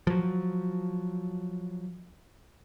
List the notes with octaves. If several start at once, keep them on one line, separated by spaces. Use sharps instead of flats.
F3 F#3